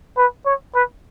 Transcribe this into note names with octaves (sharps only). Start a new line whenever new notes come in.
B4
C#5
B4